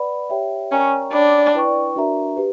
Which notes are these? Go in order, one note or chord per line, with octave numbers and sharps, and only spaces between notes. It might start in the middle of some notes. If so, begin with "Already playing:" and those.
Already playing: B4 D5 F#5 B5
G4 C#5 E5 G5
C#4 A#4 D5 G5 A#5 C#6
D4 C#5 G5 B5 D6
E4 B4 D5 G5 C#6
D4 F#4 A#4 E5 A#5
G4 B4